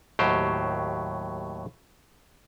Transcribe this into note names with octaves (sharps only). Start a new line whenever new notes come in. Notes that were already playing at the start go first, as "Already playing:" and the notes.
D#2 A2 F#3 G4 C5